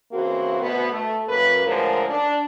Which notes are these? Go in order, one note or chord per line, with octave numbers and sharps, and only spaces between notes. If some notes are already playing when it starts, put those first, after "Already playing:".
C#3 E3 A#3 C4 F#4
D2 B2 B3
A3
F#2 A#3 B4
A2 D3 F3 G#3 A3 A#4
D4